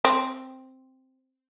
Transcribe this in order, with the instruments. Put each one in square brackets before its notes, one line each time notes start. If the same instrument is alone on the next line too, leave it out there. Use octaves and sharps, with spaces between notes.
[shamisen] C4